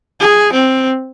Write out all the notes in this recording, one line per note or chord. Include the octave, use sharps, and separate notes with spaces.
G#4
C4